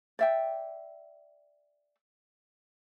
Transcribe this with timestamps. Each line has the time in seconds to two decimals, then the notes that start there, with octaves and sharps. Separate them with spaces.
0.19 D5 E5 G5